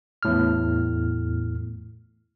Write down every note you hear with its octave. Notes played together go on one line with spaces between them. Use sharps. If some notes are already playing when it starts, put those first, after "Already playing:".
E2 A2 F6